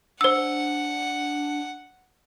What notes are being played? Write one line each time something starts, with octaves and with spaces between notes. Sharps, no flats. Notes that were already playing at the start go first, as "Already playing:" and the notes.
D4 C5 F#5 E6